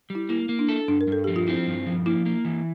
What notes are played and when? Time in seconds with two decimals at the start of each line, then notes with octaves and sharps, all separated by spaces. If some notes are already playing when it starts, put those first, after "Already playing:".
0.10 G3
0.15 E4
0.29 A#3 E4
0.49 A#3
0.59 D4
0.69 A4
0.88 G2 D4
1.01 A#4
1.07 G2 A4
1.24 F3 G4
1.36 F4
1.47 C4 E4
1.67 G2
1.86 F3
2.06 A#3 E4
2.26 A#3
2.45 E3